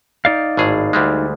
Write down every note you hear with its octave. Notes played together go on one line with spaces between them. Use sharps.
D#4 D5 F5
G#1 A2 G#4
D2 G3 G#3